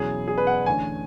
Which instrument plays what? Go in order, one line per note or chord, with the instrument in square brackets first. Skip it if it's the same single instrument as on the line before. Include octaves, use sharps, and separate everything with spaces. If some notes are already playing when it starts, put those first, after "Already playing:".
Already playing: [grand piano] E2 B2 F#3 C#4 E4 [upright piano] G#4
[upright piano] G#4
B4
F#5
[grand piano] E2 D3 A3 C#4 [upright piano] G#5